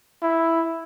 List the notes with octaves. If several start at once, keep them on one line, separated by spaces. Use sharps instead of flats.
E4